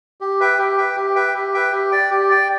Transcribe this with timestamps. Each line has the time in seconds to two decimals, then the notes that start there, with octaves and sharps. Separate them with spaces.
0.21 G4
0.40 B4 E5 G5
0.58 G4
0.78 B4 E5 G5
0.96 G4
1.15 B4 E5 G5
1.35 G4
1.54 B4 E5 G5
1.72 G4
1.92 D5 G5
2.11 G4
2.29 D5 G5